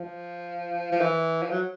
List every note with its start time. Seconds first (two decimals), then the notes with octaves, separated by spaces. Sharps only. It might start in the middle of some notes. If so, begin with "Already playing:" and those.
Already playing: F3
0.92 F3
1.01 E3
1.43 F3
1.51 F#3